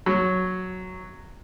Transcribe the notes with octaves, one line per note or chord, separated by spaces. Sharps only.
F#3